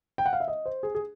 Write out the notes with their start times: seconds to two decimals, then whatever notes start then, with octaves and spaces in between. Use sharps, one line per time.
0.18 G5
0.26 F#5
0.33 F5
0.40 E5
0.48 D#5
0.66 C5
0.83 G#4
0.95 G#4